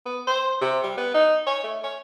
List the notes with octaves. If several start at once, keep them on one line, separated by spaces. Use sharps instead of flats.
B3
C5
C3
G3
B3
D#4
C#5
A3
C#5